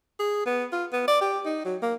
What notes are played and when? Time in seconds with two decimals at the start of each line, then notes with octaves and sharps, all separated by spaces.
0.20 G#4
0.46 B3
0.72 F4
0.93 B3
1.08 D5
1.21 G4
1.46 D#4
1.65 F#3
1.82 A#3